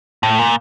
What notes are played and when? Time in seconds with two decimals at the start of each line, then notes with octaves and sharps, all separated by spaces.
0.23 A2
0.38 A#2